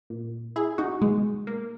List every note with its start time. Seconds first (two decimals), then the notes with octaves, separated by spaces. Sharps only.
0.10 A#2
0.56 E4 G#4
0.78 D#4 F#4
1.01 B2 G#3
1.47 A#3